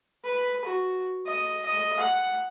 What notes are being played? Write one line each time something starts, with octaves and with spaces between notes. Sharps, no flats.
B4
F#4
D#5
D#5
F#5